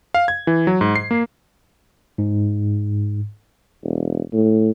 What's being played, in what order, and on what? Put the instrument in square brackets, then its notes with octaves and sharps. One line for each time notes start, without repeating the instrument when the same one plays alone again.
[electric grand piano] F5
G#6
E3
F#3
G#2
C7
A#3
[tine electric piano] G#2
[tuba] E1
A2